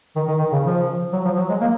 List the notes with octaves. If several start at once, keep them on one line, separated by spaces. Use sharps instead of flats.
D#3
D#3
D#3
C#3
F3
F#3
F3
F#3
G#3
A#3